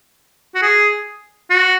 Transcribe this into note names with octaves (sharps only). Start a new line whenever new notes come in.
F#4
G#4
F#4